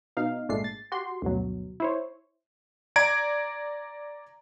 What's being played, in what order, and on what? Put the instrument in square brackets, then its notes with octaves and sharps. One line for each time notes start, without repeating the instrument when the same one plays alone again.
[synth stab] B2 D#4 F5
G#1 A#2 G#3 A3 D4 C7
A6
F#4 G4 C6
D2 G2 B2 F#3
E4 C5 C#5
[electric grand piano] D5 A#5 G#6 D7